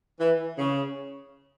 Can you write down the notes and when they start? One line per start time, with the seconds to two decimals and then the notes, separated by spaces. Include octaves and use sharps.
0.19 E3
0.58 C#3